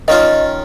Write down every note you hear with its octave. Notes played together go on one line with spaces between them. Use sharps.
D#3 C#4 F4 D#5